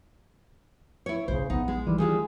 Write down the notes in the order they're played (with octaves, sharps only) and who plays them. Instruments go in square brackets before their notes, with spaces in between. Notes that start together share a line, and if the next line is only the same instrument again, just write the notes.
[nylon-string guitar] E4 C#5
[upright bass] B1 C4 [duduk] C#3 [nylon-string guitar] C5
[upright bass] A#1 E4 [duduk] B3 [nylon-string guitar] D#4
[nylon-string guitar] G#3
[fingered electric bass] D#3 E3 [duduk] G3
[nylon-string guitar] G3 G#3 F4 [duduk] G#4